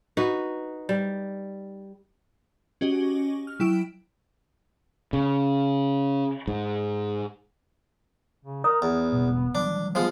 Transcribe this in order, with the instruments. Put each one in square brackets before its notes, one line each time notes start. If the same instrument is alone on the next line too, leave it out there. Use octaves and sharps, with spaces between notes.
[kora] D#4 F#4 B4
G3
[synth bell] C#4 F#4 G4 D#5
F6
F#3 E4 G5 E6 D7
[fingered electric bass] C#3
G#2
[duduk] C#3
[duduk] A#4 [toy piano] C#5 A#5 D#6
[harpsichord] E2 [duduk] B3
[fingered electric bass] E1 G2 B2
[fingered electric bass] E3 F#3 G3 [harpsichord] D4
[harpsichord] F3 G#3 F4 [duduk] B3